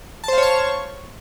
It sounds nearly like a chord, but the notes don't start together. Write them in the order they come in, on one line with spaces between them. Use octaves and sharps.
A5 C5 F5 C#5 C#6